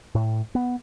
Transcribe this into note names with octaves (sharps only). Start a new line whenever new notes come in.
A2
B3